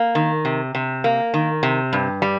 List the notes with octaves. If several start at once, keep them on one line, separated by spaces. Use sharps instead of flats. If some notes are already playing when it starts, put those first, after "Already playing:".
Already playing: A#3
D#3
C3
C3
A#3
D#3
C3
G2
G3